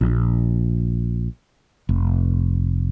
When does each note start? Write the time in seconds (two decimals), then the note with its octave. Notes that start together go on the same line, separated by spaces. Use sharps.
0.01 A#1
1.89 F1